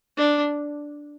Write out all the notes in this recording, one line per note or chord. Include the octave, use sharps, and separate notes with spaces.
D4